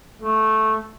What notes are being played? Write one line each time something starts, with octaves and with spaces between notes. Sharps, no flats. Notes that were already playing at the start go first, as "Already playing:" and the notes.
A3